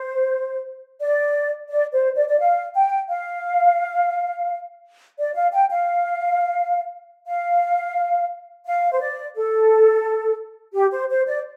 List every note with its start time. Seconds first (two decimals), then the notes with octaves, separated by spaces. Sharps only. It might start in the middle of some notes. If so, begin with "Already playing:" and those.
Already playing: C5
1.00 D5
1.69 D5
1.93 C5
2.16 D5
2.28 D5
2.39 F5
2.75 G5
3.09 F5
5.18 D5
5.35 F5
5.52 G5
5.70 F5
7.27 F5
8.66 F5
8.91 C5
9.00 D5
9.35 A4
10.74 G4
10.91 C5
11.09 C5
11.27 D5